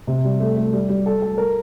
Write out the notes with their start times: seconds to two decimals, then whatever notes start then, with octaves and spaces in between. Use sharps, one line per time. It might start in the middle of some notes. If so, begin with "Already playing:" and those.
0.07 C3
0.24 G3
0.40 A3
0.57 A3
0.73 G3
0.89 G3
1.06 A4
1.22 A4
1.38 A#4